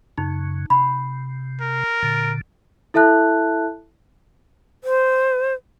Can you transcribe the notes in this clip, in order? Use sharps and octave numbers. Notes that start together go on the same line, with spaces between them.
F#2 C#3 D#4
C3 B5
A#4
A#2 D3
E4 A4 E5 A5 F#6
C5